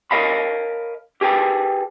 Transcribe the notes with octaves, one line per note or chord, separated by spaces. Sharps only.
A#4 C#5 D#5 F5 A5 B5
G4 G#4 B4 G5 A5